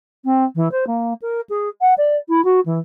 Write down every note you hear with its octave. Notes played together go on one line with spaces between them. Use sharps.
C4
E3
C5
A#3
A#4
G#4
F#5
D5
E4
F#4
E3